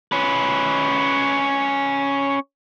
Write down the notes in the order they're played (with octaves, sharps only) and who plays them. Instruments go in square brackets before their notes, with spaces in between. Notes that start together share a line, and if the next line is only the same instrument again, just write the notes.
[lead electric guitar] C#4 B4